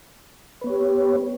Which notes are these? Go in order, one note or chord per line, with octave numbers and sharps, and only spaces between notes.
B3 G4 B4 C#5